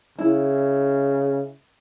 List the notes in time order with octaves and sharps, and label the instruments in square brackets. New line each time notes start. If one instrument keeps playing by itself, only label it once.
[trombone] C#3 [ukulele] E4